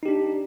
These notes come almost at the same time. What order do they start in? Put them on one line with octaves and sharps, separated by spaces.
D#4 G4 D4